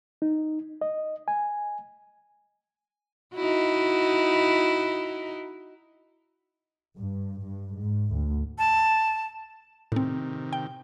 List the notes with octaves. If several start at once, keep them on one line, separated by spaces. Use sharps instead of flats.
D#4
D#5
G#5
D#4 E4 F#4
G2
G2
G#2
D2
A5
A2 C3 D#3 C4
G5